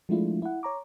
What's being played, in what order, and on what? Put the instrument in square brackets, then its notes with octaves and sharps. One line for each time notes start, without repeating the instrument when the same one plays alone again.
[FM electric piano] F3 G#3 A3 D4 E4 F4
E4 F#5
C#5 A#5 D6